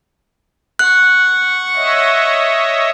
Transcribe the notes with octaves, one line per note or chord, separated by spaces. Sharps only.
F#5 C#6 F#6
C#5 D#5 E5